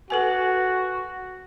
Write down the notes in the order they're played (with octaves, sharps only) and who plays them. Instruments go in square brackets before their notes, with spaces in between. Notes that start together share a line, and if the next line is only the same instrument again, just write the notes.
[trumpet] F#4 [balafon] A4 B4 G#5